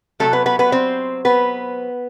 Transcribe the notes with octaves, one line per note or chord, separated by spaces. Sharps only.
C3 F#3 A3 A4
B3 B4
B3 B4
B3 B4
C4 C5
B3 B4